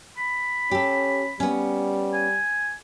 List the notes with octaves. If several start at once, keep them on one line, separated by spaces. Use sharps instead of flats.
B5
C#4 G4 A4
G3 B3 C#4
G#5